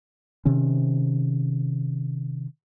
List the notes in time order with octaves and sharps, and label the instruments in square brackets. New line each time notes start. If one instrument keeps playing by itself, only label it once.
[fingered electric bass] C3 D#3 C#4